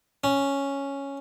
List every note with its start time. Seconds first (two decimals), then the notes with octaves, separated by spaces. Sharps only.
0.24 C#4